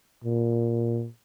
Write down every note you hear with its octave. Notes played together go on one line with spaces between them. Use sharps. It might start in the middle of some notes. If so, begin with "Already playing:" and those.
A#2